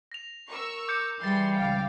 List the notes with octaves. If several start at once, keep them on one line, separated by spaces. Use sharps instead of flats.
A#6 F7
A#4 C#6 E6
D6 G6 C#7
E3 G3 G#4 C6 G6 A6
C#2 F5 G5